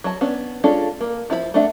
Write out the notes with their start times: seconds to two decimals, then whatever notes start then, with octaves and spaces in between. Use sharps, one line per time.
0.04 F#3 A5
0.21 B3 C#4 D4
0.64 G#3 C#4 D4 F4 A4
1.01 A#3
1.30 F3 E4 G#4 B5
1.54 A3 D4 E5 F#5